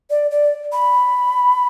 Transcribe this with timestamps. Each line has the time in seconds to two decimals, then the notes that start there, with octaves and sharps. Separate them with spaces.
0.10 D5
0.31 D5
0.72 B5